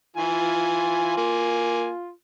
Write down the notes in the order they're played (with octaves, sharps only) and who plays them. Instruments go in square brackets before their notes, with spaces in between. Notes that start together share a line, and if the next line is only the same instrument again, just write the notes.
[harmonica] E3 G#5 [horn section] F4
[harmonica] A#3 G#5